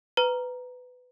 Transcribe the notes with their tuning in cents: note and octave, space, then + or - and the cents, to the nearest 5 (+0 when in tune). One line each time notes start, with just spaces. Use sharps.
B4 +15 A#5 +5